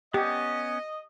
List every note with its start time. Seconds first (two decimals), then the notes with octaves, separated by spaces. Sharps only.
0.14 B3 C#4 G4 D#5